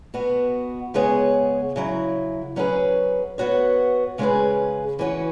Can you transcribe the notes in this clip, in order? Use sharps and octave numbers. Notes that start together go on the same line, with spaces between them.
B2 B3 F#4
C#3 G#3 B3 G#4 C#5
C#3 F#3 E4
F#3 C#4 G#4 B4
B3 F#4 C#5
C#3 G#3 C#4 G#4 B4
E3 C#4 F#4 B4